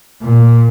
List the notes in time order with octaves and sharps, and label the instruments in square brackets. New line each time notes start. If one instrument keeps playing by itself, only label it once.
[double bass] A#2